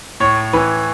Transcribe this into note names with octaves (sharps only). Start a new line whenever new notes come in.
A2 C#5
E3 B4